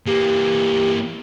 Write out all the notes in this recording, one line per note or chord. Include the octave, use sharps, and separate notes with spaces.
E3 A#3 G4